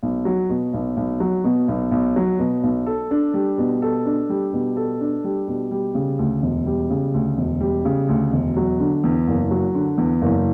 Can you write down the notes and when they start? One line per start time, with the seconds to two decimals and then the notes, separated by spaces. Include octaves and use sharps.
0.03 B1
0.25 F#3
0.49 B2
0.74 B1
0.97 B1
1.20 F#3
1.44 B2
1.68 B1
1.91 B1
2.16 F#3
2.39 B2
2.63 B1
2.86 A4
3.11 D4
3.34 G3
3.58 B2
3.82 A4
4.06 D4
4.29 G3
4.53 B2
4.77 A4
5.01 D4
5.24 G3
5.48 B2
5.71 G3
5.95 C#3
6.19 D2
6.43 E1
6.66 G3
6.90 C#3
7.14 D2
7.38 E1
7.60 G3
7.85 C#3
8.09 D2
8.33 E1
8.57 F#3
8.80 D3
9.04 E2
9.28 F#1
9.51 F#3
9.75 D3
9.98 E2
10.22 F#1